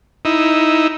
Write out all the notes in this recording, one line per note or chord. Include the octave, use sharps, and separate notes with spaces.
D#4 E4